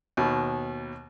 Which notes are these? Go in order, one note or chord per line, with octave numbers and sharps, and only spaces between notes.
D#2 B2